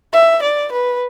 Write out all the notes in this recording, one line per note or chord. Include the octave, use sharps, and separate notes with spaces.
E5
D5
B4